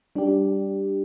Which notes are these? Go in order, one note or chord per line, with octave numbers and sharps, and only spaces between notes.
G3 D4 G4